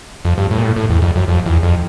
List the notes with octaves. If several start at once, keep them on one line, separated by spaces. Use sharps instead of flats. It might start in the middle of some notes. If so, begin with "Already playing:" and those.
F2
G2
A2
A#2
A2
A2
E2
F2
F#2
F2
E2
F2